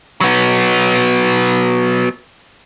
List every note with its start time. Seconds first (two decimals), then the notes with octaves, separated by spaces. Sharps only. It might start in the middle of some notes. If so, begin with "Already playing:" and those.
0.21 F#3 B3